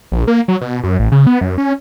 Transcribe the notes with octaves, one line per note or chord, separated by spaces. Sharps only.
A#1
A#3
F#3
B2
F#2
A1
C#3
B3
F#2
C#4